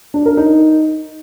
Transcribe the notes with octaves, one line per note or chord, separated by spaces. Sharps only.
D4
A#4
D#4